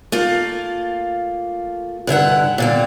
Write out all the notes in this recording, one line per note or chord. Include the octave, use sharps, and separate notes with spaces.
A3 A#3 F4
G2 D3 E4 F#5
A#2 D3 C4